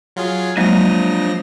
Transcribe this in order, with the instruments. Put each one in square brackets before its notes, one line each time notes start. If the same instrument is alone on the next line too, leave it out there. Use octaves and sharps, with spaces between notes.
[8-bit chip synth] F#3 F4 G#4
[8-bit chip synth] F3 A#6 [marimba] F#3 G#3 A#3 [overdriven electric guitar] D4 D#5